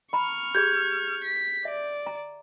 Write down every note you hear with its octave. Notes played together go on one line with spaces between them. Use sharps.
A#5 B5 C#6 F6
G4 G#4 G6 G#6
B6
D5 E5
A#5